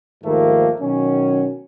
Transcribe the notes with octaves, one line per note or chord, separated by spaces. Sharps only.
D#2 G#2 D#3 F3 A3 A#3
B2 D#3 F#3 C#4